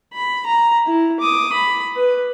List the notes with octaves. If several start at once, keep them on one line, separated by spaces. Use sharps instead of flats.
B5
A#5
E4
D6 D#6
B5
B4